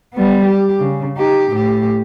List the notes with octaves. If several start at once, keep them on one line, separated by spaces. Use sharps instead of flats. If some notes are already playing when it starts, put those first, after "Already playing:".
G3 B3
G4
C#3
D#4 G4
A2 G4